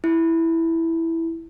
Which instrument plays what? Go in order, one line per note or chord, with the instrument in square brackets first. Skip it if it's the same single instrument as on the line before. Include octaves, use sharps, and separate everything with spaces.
[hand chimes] E4